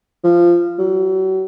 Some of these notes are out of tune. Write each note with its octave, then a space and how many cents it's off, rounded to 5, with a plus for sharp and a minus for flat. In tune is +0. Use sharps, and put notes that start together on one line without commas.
F3 -10
F#3 +40